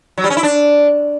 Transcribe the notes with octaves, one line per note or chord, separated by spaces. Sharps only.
F#3
G3
C#4
E4
D4